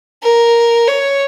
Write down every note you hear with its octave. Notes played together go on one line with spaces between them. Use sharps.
A#4
C#5